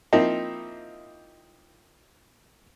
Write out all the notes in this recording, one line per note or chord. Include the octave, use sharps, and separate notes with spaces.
F3 A#3 C4 D#4 E4